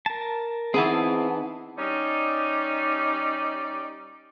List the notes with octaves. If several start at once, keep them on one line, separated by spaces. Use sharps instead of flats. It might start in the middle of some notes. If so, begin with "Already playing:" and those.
A#4 A5
E3 B3 C4 D#4 E4 G#4 F#5 A5
G3 C#4 D#4 D5